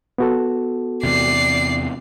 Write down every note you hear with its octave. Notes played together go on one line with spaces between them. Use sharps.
B3 F#4 A4
E2 C3 D5 C7